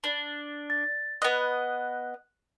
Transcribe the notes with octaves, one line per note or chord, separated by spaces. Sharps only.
D4
A6
B3 D#5 F#6